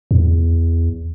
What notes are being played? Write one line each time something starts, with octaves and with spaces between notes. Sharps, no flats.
E2